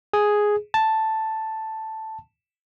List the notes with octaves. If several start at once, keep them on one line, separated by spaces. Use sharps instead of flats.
G#4
A5